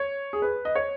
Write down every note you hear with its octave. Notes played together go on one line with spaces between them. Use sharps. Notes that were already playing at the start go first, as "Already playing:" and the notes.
Already playing: C#5
G#4
B4
D#5
C#5